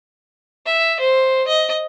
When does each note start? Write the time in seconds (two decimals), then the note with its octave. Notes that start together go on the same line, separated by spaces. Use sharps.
0.66 E5
1.00 C5
1.48 D#5